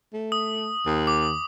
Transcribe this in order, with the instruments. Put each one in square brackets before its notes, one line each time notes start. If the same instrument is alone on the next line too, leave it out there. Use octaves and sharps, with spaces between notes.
[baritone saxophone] A3
[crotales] D#6
[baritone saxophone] D#2
[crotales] D6